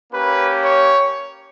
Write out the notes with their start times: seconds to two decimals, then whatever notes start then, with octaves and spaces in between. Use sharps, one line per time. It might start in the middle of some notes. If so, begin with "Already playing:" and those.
0.13 A#3 C#4 G4 B4
0.64 C#5